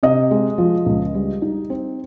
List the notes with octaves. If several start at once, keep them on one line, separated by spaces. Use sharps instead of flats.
C3 D#5
G#3
F3
C#2
G3
D#4
C4